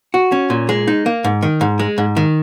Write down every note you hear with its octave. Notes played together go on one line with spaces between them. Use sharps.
F#4
C#4
A#2
G#3
D#4
A#3
G#2
D#3
G#2
G#3
G#2
D#3